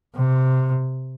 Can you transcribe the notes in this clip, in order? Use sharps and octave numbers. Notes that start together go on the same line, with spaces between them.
C3